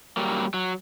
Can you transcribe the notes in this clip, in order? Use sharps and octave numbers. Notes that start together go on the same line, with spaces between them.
F#3 G3 A#3
F#3